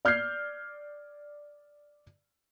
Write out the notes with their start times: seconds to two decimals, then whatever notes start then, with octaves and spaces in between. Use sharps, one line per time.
0.05 D5 F6 G6 G#6 C7